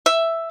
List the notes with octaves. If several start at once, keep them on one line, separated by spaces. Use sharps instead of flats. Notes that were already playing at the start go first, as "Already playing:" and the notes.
E5